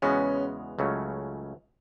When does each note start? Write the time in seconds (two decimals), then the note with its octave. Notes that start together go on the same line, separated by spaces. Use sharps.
0.02 E2 C#3 G#3 B3 C#4 F#4
0.79 C#2 C#3 F#3 A3 C#4